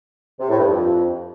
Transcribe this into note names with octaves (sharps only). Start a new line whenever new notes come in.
C3
A2
G2
F2